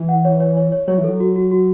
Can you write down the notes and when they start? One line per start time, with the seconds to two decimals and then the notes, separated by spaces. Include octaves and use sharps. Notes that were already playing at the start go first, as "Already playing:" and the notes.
Already playing: E3
0.09 F#5
0.25 C#5
0.40 C#5
0.57 C#5
0.72 C#5
0.88 F#3 C#5
0.98 E3
1.04 F#3 A4
1.20 F#4
1.36 F#4
1.51 F#4